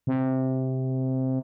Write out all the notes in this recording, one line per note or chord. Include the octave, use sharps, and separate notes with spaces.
C3